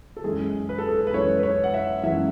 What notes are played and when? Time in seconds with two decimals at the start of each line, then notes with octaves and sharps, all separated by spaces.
0.17 A4
0.24 F#2 E3 G#3 C#4 G#4
0.69 B4
0.78 A4
0.88 G#4
0.98 A4
1.07 B4
1.13 F#2 E3 G#3 C#4 C#5
1.39 B4
1.43 C#5
1.64 F#5
1.74 E5
2.03 F#2 E3 G#3 C#4 E5